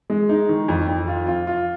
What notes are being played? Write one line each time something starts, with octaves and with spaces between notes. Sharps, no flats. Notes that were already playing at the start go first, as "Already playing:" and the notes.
G#3
D#4
D#3
F2
F2
F4
F4
F4